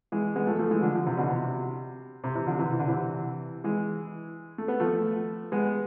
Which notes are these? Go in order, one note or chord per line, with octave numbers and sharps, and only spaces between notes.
E3 G#3
G#3 B3
F3 A3
F3 A3
E3 G#3
D3 F3
D3 F3
C3 E3
B2 D3
C3
C3
C3 E3
D3 F3
C3 E3
E3
D3
C3 E3
E3 G#3
A3
B3
F3 A3
G#3 B3